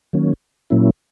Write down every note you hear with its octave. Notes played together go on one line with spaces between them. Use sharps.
D#3 F#3 A#3 C#4
A#2 F#3 A#3 C#4 E4